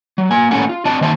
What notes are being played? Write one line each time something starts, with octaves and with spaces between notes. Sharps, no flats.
F#3
A#3 G#5
A2 A#3 C#4 A4 F#5 G#5
F4
C4 D4 D5 D#5 A5
D#3 A#3 C5 E5 A5